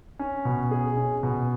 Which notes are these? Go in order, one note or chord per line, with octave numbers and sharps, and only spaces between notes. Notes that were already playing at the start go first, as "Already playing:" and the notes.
C#4
B2
G#4
C#4
B2